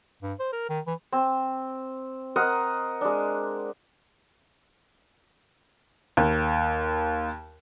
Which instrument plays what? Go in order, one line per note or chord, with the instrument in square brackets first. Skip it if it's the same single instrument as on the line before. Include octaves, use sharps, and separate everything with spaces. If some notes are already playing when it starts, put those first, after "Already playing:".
[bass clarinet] G2
C5
A#4
D#3
E3
[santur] C4
A#4 C5 D#5 F#5
G#3 D4
[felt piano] D#2